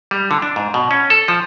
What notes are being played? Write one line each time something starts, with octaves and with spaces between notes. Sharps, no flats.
G3
D3
D4
G#2
B2
C#4
A4
F3